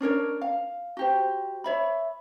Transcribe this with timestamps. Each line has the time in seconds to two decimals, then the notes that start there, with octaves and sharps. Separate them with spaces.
0.01 C#4 D4 A#4 C#5
0.41 F5
0.97 F#4 G4 C5
1.64 C#5 E5 B5